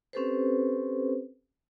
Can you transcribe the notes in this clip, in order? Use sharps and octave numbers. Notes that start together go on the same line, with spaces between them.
C4 C#4 G4 A4 B4 C5